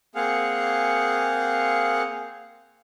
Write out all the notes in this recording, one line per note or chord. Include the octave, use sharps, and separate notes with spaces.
A#3 C4 G#4 F5 F#5